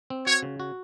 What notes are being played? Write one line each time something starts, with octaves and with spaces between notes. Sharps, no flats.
C4
F#4 C#5
C#3
F#4